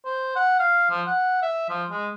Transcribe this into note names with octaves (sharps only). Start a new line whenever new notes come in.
C5
F#5
F5
F3
F#5
E5
F3
G#3